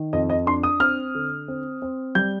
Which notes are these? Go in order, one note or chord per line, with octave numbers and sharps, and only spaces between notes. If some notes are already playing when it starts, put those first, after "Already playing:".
Already playing: D#3
F2 D#5
D#5
D4 C6
D#6
C4 F6
D3
C4
C4
G3 G6